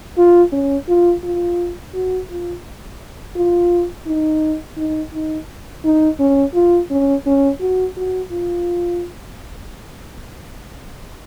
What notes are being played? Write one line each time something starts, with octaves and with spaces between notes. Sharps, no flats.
F4
C#4
F4
F4
F#4
F4
F4
D#4
D#4
D#4
D#4
C#4
F4
C#4
C#4
F#4
F#4
F4